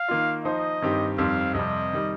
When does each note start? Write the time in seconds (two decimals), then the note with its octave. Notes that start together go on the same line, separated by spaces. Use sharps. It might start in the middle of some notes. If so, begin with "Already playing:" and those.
Already playing: F5
0.09 D#3 A#3 F4
0.45 F3 D#4 C5 D#5
0.82 G2 D#3 C4 G4
1.18 F2 D#3 G3 C4 F5
1.55 F2 C3 G3 D#5
1.93 D#3 G3